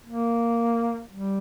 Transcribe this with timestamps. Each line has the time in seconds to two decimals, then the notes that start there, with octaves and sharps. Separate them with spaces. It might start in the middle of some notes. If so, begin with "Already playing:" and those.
0.06 A#3
1.13 G3